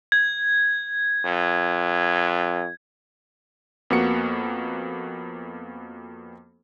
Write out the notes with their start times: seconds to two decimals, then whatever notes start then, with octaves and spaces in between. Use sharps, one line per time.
0.12 G#6
1.25 F2
3.90 F2 A#3 B3 F#4 C#7